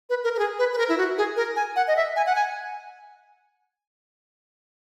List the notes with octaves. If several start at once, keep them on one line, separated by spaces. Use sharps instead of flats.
B4
A#4
A#4
G#4
B4
B4
A#4
E4
F#4
G#4
A#4
G#5
F#5
D#5
E5
G#5
F#5
G#5